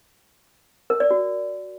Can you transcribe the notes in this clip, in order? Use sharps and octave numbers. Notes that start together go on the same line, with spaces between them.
A#4
D5
F#4